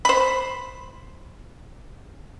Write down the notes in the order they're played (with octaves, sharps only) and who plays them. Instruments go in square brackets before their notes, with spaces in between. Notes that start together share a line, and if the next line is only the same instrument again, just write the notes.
[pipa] C5 B5